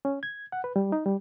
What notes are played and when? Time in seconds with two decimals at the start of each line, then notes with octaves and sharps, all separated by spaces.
0.05 C#4
0.23 G#6
0.52 F#5
0.64 B4
0.76 G3
0.92 D#4
1.06 G3